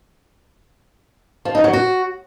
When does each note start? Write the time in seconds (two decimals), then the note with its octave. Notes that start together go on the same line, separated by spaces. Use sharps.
1.45 F3
1.55 D#4
1.64 F#3
1.73 F#4